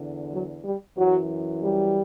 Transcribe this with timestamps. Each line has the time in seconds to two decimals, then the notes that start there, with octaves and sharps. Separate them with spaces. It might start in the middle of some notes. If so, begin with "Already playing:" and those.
Already playing: E2 D3
0.31 F#3
0.64 G3
0.97 F#2 E3 F#3
1.62 G3